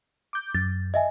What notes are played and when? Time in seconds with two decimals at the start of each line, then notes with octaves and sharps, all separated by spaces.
0.33 D6 G6
0.55 F#2 A6
0.94 D#5 E5 G#5